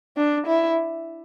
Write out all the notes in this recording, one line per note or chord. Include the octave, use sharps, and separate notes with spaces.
D4
E4